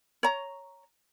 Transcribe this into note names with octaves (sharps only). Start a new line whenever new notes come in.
C#5 A#5